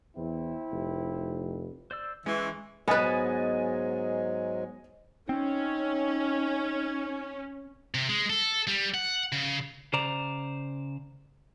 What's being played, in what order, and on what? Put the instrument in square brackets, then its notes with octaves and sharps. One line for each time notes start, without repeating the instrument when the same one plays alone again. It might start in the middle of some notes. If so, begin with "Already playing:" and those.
[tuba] E2 [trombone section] C4 E4
[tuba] F1
[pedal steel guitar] C5 D5 E6
[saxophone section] E3 [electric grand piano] G#3 [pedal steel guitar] C#4 C#6
[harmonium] G#2 F#3 G#3 [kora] B3 B4 [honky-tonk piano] D#5 G#5 A6
[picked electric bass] C4 [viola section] C#4 [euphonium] D#4
[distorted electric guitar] C3
G#3
A4
G3
F#5
C#3
[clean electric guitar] C#3 C5 D5 A#5